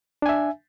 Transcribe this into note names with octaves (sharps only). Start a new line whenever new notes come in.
D4 E5 G#5